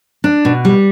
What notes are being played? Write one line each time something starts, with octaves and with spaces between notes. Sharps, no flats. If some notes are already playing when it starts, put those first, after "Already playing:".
D4
B2
G3